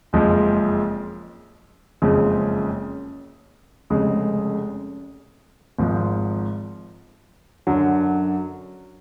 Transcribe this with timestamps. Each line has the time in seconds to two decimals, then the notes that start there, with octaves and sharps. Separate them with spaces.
0.13 F#1 F2 F3 G#3
2.02 F#1 F2 C#3 F3 G#3
3.90 F1 F2 C#3 G#3
5.79 G#1 G#2 F3
7.67 F#2 D3 F#3